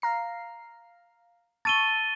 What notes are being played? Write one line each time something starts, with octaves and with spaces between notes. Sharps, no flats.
F5 A#5 C7
A5 C#6 E6 A6 D#7 G7